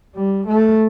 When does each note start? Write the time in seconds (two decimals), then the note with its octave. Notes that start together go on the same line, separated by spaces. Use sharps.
0.15 G3
0.47 A3